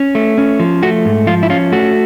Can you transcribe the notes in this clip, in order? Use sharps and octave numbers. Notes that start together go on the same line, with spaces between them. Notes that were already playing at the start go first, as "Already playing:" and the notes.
Already playing: C#4
A3
C#4
F3
A3 F#4
G#2
F3 F4
E4
C#4 F4
A3 F#4